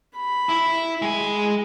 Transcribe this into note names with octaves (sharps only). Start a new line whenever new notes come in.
B5
E4
G#3 G#5